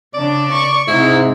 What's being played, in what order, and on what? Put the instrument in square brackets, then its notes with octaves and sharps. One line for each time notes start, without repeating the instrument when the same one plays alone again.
[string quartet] C#3 D4 [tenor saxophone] D5
[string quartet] C#6
[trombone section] G#2 [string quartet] C3 [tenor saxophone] E4